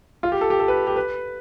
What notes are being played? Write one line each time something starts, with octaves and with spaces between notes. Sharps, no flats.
F4
G4
A4
G4
A4
B4
G4
B4